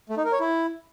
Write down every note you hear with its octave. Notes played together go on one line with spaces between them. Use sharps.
A3
D#4
A#4
C#5
E4